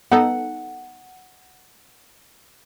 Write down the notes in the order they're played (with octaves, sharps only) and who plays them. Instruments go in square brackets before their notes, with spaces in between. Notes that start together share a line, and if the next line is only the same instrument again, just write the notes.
[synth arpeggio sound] B3 D#4 A4 [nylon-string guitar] F#5